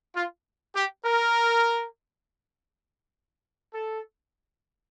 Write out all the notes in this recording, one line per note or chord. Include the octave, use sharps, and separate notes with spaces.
F4
G4
A#4
A4